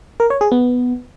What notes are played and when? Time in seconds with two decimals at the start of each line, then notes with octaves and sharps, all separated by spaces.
0.20 A#4
0.30 C#5
0.41 G#4
0.52 B3